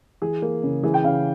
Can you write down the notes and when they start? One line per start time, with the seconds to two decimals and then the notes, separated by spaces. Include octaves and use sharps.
0.22 E3 G#4
0.42 A#3
0.63 C#3
0.83 E3 G#4
0.94 G5
1.04 C#3 F5